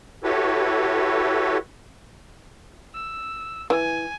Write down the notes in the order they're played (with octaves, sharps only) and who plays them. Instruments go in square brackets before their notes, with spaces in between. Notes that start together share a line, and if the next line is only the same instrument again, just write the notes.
[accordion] E4 F#4 G4 A4 B4 C#5
[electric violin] E6
[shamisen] E3 [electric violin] G#5